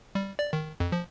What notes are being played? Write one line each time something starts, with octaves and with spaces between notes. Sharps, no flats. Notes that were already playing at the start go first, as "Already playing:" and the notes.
G3
D5
D#3
F2
F3